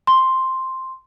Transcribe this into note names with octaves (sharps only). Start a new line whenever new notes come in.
C6